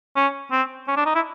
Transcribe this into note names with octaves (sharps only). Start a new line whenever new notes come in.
C#4
C4
C#4
D4
D#4
E4